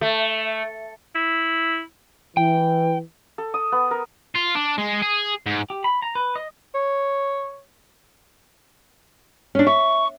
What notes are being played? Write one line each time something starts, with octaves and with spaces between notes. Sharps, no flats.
A3
E4
E3 G5
A4
D#6
B3
A#4
F4
D4
G#3
G#4
G#2
G4
B5
A#5
B4
D#5
C#5
C#4 D4
E5 C#6